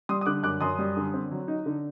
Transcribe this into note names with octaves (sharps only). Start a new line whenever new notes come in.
G3 C6 D#6
D#6
D3 D6 F#6
F#2 D6 F#6
F#2 C6 D#6
G3
D3
C4
F#3
D#4
D3